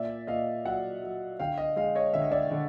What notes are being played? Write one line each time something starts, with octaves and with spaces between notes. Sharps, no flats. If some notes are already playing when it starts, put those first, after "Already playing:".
Already playing: A#2 D5 E5
A#2 D#5 F5
F#3 E5 F#5
F#3
D3 F5 G5
D#5 F5
G#3 D#5 F5
C#5 D#5
D3 E5
D#5
D5 E5
D3